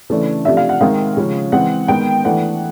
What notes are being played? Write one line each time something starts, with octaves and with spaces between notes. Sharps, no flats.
C#3 E3 A3 D4
C3 F3 A3 D4 E5
F5
F#5
D#3 G#3 C4 F5
C#3 F3 G#3 C#4
E3 G#3 C4 F#5
D#3 G#3 B3 G5
E3 A3 D4 F#5